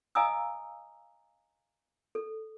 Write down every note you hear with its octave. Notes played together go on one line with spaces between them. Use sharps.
D#5 F5 G#5 A#5 D#6 E6
A4